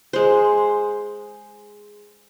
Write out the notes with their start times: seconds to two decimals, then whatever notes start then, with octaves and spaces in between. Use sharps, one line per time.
0.13 G#3 C5